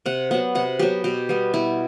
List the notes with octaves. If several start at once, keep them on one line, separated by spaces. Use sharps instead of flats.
C3 F#5
F#3 B3 F#5
C3 F#5
F#3 B3 G4
B2 G4
G3 B3
B2 E4